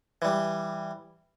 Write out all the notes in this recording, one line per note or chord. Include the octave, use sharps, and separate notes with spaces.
E3 G3